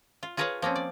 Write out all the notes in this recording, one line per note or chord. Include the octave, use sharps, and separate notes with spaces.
F4
F4 G#4 A#4 B4 C#5 F5
F3 A#3 C4 C#4
D5